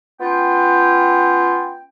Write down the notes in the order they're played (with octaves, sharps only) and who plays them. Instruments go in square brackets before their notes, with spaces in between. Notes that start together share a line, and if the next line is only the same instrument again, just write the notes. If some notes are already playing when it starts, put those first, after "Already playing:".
[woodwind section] B3 C#4 F4 G5